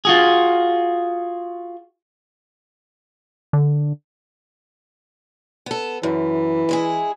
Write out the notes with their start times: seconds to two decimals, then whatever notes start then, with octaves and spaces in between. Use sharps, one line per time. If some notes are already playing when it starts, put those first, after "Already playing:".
0.05 F4 F#4 G#4
3.53 D3
5.66 B3 A4
6.03 F#2 E3
6.69 G#3 E4 G#4